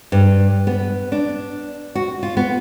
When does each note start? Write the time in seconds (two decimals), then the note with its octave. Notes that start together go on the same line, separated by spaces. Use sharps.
0.12 G2
0.67 B3
1.12 D4
1.95 F#4
2.23 F4
2.37 B3